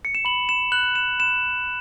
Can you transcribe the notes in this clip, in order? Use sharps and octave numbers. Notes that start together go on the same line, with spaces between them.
C#7
E7
B5 F#7
E7
F#6 F#7
E7
B5 E7